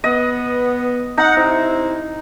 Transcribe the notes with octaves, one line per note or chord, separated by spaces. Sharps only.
B3 D#5
D#4 F#5 A#5
C3 C4 E4